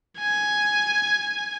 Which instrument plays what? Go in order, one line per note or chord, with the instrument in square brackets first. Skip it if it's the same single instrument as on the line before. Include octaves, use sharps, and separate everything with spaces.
[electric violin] G#5